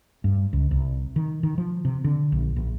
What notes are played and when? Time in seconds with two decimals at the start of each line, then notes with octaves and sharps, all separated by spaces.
0.24 G2
0.53 C#2
0.71 C2
1.16 D#3
1.43 D#3
1.58 F3
1.85 C3
2.04 D3
2.32 A#1
2.56 A#1